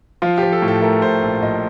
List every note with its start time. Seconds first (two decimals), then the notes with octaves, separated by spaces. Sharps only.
0.22 F3 F4
0.38 G4
0.43 F3
0.52 A4
0.62 A2
0.68 A4
0.82 A3 A#4
1.02 A2 C5
1.23 A#1
1.42 A#1 D#5